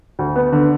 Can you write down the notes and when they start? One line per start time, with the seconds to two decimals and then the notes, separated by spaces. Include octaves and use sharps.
0.19 D2
0.36 B3
0.52 D3